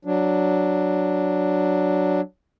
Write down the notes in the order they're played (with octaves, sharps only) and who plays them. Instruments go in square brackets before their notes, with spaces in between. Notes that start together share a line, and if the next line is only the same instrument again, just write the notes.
[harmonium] F#3 D4